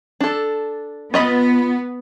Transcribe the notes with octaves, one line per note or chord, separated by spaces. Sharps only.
D4 A4
B3 F4 D#5 B5